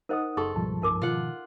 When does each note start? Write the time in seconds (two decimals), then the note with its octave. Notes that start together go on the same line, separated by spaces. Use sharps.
0.09 D#4 A#4 C5 D#5 F#5 D#6
0.37 F#1 G#4 A4 C6 C#6
0.56 C#2 G#2 B2 F3 G3 A5
0.82 C2 G2 D#4 A#4 D6
1.02 B2 D#3 F4 F#5